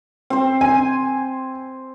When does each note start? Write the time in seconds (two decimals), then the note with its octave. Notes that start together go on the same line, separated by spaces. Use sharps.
0.30 C4 C5
0.61 G#5